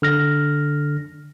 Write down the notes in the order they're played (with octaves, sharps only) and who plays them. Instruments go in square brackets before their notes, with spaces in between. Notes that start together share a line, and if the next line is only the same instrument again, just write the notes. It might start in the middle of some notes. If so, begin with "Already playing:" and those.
[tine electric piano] D3 F6 A#6